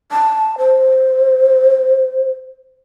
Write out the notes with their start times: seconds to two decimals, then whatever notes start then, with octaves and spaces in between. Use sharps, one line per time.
0.12 A5
0.58 C5